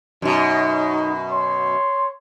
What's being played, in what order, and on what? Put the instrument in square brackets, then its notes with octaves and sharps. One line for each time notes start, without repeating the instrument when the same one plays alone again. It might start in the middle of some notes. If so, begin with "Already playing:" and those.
[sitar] F#2 B2 [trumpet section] D#4
[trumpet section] C#5 C6